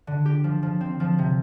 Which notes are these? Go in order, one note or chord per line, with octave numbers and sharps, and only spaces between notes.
D3
G4
F3
F3
C4
F3
C3